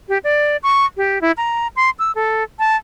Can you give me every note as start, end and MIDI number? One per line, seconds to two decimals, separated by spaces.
0.09 0.18 67
0.24 0.57 74
0.63 0.85 85
0.97 1.21 67
1.21 1.31 64
1.37 1.67 82
1.76 1.90 84
1.99 2.11 88
2.15 2.43 69
2.59 2.76 81